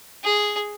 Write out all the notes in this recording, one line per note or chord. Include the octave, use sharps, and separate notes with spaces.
G#4